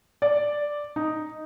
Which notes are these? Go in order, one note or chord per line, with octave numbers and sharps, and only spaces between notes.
D5
D#4